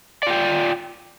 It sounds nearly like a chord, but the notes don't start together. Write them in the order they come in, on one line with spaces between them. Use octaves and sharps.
D5 F4 G5